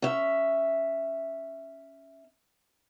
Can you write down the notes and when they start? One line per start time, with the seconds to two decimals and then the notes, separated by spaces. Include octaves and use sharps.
0.02 C#4 E5